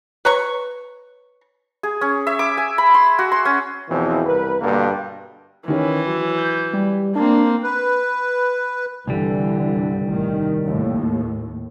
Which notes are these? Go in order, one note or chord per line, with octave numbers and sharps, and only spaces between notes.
B4 C#5 A#5 C#6
G#4
C#4
E5
D6
G#5
B5
C6
F#4
C6
C#4
E2 B2 E3 F3 C4
C2 A#4 B4
G2 B2 D3 A#3
D#3 E3 C#4
F#3
G6
G3
A#3 C4 D4
B4
C2 G2 D3 E3 G3
A1 D#3
D#2 A2